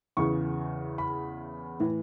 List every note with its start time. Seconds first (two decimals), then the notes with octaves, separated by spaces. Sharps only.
0.17 E2 C#3 E3 C#6
0.98 B5
1.80 A2 E3